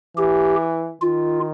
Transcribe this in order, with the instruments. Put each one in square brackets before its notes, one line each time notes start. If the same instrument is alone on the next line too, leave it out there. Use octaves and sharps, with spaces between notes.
[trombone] E3 [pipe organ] G4
[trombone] D#3 [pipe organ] F4